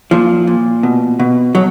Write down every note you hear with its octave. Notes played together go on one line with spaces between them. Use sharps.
A#2 F3
A#2
B2
B2
B2 F#3